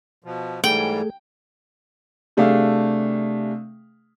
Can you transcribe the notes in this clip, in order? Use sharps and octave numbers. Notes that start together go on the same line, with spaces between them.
B2 F3
G#2 E3 G3 A3 G#4 A4 G5
C3 A3 D4 G#4 F5